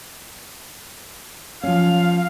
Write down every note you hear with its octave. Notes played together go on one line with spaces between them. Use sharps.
F3 C#4 F5